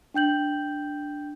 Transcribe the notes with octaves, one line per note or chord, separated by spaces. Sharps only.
D4 G5 G6 F#7